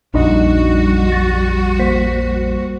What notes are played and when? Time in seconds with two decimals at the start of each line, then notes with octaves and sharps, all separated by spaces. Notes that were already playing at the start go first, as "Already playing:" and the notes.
0.14 A#1 F2 A#2 G3 D4 D#4 F#4 D#5
1.12 A6 A#6
1.79 A#3 C5 B6